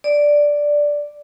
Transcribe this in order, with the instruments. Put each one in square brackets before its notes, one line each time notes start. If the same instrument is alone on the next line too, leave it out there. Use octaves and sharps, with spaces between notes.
[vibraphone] D5